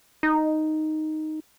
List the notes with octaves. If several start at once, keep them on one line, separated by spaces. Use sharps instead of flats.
D#4